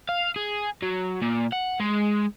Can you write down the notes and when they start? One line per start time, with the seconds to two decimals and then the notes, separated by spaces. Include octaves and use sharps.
0.09 F5
0.36 G#4
0.83 F#3
1.22 A#2
1.53 F#5
1.80 G#3